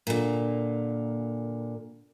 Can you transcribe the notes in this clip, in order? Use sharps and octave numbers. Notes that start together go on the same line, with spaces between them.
A#2 D3